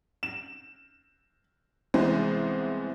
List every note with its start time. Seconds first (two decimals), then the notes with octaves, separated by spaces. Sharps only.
0.23 E7
1.94 C2 E3 G#3 B3 G#4 C5